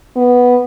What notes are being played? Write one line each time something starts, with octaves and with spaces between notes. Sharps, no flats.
B3